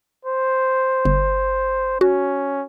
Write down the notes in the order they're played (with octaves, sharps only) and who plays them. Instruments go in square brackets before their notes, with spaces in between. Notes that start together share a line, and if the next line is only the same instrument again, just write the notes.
[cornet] C5
[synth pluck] G1
[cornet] C#4 [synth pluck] F#4